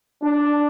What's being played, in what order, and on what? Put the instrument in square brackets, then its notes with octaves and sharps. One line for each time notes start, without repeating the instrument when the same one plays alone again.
[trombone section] D4